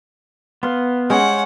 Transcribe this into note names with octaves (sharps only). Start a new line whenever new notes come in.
B3 F5 C6
G#3 C#4 C5 F#5